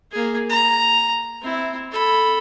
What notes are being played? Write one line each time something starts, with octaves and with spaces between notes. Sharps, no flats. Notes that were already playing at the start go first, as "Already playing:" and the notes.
A#3 G#4
A#5
C4 E4
A4 B5